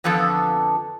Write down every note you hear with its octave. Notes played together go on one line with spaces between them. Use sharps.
F2 D3 F3 B3 A4